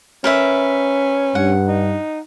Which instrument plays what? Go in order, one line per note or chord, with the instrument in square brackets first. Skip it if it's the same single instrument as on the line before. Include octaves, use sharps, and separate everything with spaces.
[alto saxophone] C#4 [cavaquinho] A#4 B4 E5
[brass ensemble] G2 [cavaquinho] F#5
[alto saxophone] D#4